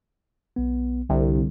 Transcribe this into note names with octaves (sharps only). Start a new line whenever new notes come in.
B1 B3
C2 D3